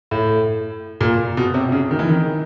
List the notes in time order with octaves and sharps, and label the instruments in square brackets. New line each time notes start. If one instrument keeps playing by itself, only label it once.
[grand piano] A2
A#2
B2
C3
C#3
D#3
E3
D#3